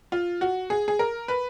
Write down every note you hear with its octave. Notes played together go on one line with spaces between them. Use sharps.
F4
F#4
G#4
G#4
A#4
B4